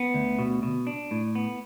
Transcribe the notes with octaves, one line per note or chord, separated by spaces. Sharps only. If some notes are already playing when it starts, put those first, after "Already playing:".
Already playing: B3
D2
B2
B2
D4
A2
B3